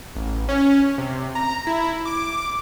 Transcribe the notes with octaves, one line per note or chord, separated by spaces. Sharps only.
A1
C#4
C3
A#5
E4
D6